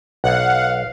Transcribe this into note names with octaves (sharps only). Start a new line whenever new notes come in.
B1 F5 F#5